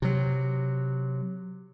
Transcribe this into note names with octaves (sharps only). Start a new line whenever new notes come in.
C3 F#3